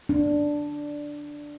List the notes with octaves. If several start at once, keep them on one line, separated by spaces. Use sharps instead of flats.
D4